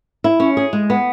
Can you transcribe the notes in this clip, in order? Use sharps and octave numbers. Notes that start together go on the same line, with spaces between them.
E4
C#4
G#4
G#3
B3